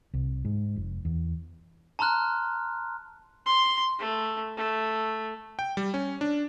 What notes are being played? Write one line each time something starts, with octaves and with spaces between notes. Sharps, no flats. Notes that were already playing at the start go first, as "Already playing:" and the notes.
C2
G#2
F1
E2
A5 A#5 C6 F6 F#6
C6
A3
A3
G5
G3
C#4
D4